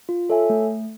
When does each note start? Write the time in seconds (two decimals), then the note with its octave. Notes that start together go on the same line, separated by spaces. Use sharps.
0.09 F4
0.30 A4 C#5 E5 G#5
0.50 A3